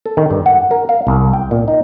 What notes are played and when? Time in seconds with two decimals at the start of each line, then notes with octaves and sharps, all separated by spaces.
0.06 A4
0.17 D#3
0.31 G2
0.46 F#5
0.71 A#4
0.89 F5
1.07 C2
1.33 G5
1.51 A#2
1.68 D#4